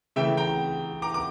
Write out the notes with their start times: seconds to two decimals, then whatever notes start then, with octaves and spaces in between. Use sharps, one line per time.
0.16 C#3 E3 A3 E5 G5
0.37 G5 A#5
1.02 A#5 D6
1.14 D6